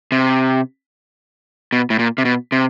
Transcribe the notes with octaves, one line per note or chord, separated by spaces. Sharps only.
C3
B2
A2
A#2
C3
B2
C3